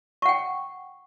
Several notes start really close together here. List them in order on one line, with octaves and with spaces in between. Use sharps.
C#6 F#5 G5